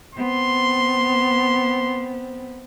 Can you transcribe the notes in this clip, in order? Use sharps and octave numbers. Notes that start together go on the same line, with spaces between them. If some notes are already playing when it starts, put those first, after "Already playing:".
B3 C4 C6